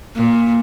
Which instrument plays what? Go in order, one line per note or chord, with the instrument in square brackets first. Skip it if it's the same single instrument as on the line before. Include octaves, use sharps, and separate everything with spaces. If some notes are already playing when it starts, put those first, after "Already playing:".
[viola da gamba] A#2